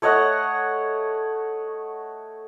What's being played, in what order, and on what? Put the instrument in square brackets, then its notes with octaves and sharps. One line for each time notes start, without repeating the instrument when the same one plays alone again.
[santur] A3 C#5 D#5 F#5